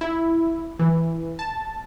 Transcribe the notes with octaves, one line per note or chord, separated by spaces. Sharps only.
E4
E3
A5